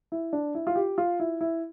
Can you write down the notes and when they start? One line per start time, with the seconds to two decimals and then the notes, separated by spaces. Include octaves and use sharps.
0.12 E4
0.33 D4
0.55 E4
0.67 F4
0.76 G4
0.98 F4
1.20 E4
1.41 E4